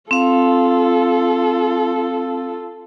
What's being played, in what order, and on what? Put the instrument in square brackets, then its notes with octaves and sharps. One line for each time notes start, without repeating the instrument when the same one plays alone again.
[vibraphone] C4 F5 [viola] F4 A4